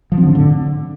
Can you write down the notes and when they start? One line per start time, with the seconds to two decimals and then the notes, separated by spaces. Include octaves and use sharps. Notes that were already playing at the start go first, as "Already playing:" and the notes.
0.12 F3
0.17 C4
0.23 D3
0.29 A2
0.35 D3